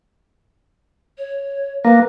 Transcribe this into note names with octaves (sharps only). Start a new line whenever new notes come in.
C#5
A#3 B4